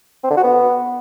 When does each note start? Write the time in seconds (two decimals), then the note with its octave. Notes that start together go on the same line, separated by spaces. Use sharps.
0.24 C4
0.30 D3
0.37 F#4
0.44 B3